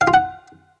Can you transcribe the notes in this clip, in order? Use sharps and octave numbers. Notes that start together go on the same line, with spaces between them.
F5
F4
F#5